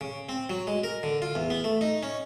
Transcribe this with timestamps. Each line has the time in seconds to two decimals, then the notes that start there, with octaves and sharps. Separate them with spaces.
0.01 C#3
0.29 C4
0.50 F#3
0.67 G#3
0.84 A#4
1.03 D3
1.22 F4
1.35 E2
1.50 B3
1.64 A3
1.81 D#4
2.03 C#4